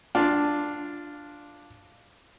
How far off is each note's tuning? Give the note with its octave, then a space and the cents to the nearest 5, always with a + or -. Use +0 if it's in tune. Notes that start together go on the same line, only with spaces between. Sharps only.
D4 +0 F4 +0